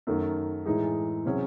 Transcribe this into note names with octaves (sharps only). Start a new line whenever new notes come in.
F#2 D#3 A3
A2 E3 G#3 D#4 G#4
C3 F#3 C#4 G#4